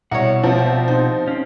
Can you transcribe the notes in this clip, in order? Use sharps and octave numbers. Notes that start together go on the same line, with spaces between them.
C2 B2 A#4 C#5 F#5
F3 C4 A#4
G4
D#4 C5
C4 C#4